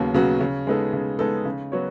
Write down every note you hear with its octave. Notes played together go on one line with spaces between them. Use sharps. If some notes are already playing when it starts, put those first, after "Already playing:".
Already playing: D#2 C#3 F#3 B3 F#4
C#3 F#3 B3 F#4
C#3
G#3 B3 D#4 A4
C#3
G#3 B3 D#4 A4
C#3
F#3 B3 F#4 C#5